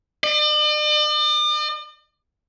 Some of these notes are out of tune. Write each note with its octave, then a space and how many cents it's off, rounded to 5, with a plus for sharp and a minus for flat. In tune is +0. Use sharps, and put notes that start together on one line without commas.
D5 +45